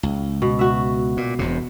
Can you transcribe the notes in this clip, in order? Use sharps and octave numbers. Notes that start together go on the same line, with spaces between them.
C#2
B2
F#4 E5
A#2
E1 E2 C3